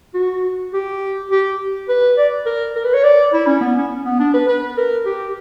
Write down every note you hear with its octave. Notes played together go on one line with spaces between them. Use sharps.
F#4
G4
G4
B4
D5
A#4
A#4
B4
C#5
D5
E4
C#4
B3
C#4
B3
D4
B4
B4
A#4
G4